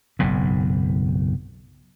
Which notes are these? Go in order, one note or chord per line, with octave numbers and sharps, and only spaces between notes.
F#1 B1 G#2